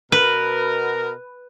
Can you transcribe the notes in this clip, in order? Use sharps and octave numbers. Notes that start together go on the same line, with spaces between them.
B2 A#4 B4